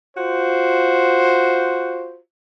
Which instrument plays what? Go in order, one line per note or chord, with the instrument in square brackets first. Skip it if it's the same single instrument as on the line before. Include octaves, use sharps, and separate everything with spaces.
[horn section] F4 F#4 C5